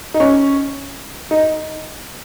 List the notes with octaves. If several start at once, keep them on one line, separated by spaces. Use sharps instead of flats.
D#4
C#4
D#4